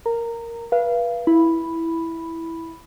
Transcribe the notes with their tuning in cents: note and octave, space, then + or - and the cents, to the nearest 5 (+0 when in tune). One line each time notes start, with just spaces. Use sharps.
A#4 +0 A#5 -15
B4 -30 F5 -30
E4 +0 B5 +0